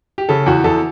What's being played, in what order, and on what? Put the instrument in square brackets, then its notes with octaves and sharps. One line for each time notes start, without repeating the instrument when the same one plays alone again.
[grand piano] G4
C#3 A4
E2 F#4
E2 A4